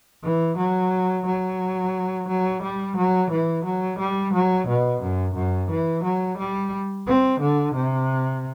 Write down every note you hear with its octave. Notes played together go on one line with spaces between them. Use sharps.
E3
F#3
F#3
F#3
G3
F#3
E3
F#3
G3
F#3
B2
F#2
F#2
E3
F#3
G3
C4
D3
C3